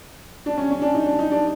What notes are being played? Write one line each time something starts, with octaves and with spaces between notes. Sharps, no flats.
D4
C#4
C#4
D4
D#4
D4
D#4
D4